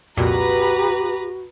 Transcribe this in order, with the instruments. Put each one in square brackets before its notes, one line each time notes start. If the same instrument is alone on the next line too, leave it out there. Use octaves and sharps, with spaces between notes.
[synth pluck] C2 F2 A#2 [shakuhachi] F#4 [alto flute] G4 [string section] B4 A#5